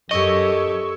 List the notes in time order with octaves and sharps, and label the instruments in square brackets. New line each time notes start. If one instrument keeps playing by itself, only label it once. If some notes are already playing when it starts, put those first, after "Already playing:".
[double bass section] F#2 [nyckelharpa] G4 A4 [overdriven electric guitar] D#5 [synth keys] C#6 E6 G#6